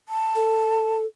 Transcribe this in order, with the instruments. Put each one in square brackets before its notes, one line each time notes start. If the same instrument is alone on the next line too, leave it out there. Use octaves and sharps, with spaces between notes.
[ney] A5
[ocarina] A4